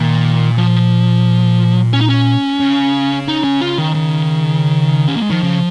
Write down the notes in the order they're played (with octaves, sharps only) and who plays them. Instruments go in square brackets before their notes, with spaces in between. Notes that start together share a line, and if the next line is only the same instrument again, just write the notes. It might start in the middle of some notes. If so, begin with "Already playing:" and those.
Already playing: [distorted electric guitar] A#2 [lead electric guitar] D#3
[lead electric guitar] F3
C#4
D#4
C#4
[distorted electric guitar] C#3
[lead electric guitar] D#4
C#4
F4
D#3
D#3
C#4
A#3
G#3
[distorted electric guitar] D#3 [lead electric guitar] F3
[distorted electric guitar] C#3